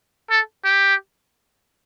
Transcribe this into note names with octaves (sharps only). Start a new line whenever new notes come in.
A4
G4